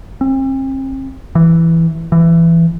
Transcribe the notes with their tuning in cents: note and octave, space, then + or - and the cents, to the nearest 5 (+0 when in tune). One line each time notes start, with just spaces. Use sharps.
C4 +40
E3 +5
E3 +15